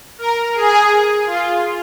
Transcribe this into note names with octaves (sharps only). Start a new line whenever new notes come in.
A#4
G#4
F4